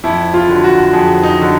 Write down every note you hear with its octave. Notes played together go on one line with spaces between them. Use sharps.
F2 E4
F4
D3 F#3
F#4
F2 G#4
D#4
D3 F#3